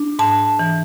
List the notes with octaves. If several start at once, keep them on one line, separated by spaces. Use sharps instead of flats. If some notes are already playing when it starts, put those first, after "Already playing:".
Already playing: D4
G#2 A5
E3